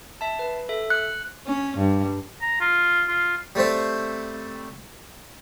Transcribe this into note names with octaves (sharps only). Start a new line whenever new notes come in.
E5 A5
B4
A4 E5
F#6 C#7
C#4
G2
A#5
F4
F4
G3 A3 C4 C5